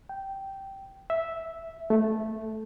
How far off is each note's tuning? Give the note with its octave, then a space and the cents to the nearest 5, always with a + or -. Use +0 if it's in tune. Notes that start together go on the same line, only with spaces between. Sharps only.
G5 -10
E5 -5
A3 -10